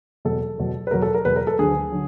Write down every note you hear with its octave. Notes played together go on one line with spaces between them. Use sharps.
E2 B2 F#3 A4
E2 B2 F#3
B4
E2 B2 F#3 A#4
A4
A#4
E2 B2 F#3 B4
A#4
A4
D2 D3 F#3 G#4
D3 F#3